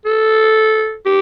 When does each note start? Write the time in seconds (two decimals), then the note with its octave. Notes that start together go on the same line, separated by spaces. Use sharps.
0.05 A4
1.05 G4